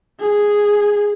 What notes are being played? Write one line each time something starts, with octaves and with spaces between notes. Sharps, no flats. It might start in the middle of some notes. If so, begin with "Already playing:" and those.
G#4